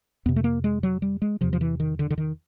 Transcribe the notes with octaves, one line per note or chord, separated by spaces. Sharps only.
F2 C3 B3
A3
A#3
G#3
F#3
G3
G#3
E2 C3 F3
F3
E3
D#3
D3
D3
D#3